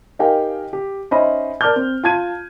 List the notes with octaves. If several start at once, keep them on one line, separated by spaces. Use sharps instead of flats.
D#4 G4 A#4 F5 G5 G#5
G4
C#4 D#4 C5 D#5 E5 B5
A#4 D5 A5 D6 F6 G6
C4
F4 A5 G#6 D#7